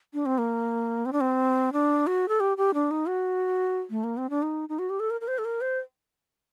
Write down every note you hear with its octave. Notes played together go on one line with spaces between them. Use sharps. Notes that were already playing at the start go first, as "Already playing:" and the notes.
D4
C4
A#3
C4
D4
C4
D4
F#4
A4
G4
G4
D4
D#4
F#4
A3
A#3
C4
D4
D#4
D#4
F#4
G4
A4
A#4
A#4
C5
A4
A#4
C5